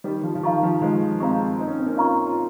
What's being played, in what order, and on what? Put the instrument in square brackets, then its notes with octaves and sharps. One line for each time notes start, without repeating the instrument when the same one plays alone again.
[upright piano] D#3 G3 [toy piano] C5
[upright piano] F3
F3
[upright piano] D#3 [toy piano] F5 A#5 C#6
[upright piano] F3
[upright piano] F3 G#3 [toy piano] C5
[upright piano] G#3 C4 [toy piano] F5 A#5 C#6
[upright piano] D#4 [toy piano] C5
[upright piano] C#4
C4
A#3 C#4
[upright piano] C#4 F4 [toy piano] F5 A#5 C#6
[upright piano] F4